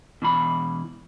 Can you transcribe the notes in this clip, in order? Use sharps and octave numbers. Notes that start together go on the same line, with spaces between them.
B2 E3 B5